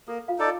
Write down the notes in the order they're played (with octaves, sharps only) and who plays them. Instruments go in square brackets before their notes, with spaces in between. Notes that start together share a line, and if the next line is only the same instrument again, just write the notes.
[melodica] A#3 [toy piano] A4
[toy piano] F4 F5
[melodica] D#4 A4 D5